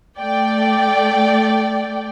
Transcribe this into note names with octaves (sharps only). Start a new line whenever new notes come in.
A3 D5 G5